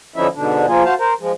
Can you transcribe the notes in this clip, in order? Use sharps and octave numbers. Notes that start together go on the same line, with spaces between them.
D3 F3 C#4 D#4 E4 E5
G#2 B2 D3 D4
F3 A#3 F4 G#4
F#4 C5 F5 A5
A#4 C5
F3 G#3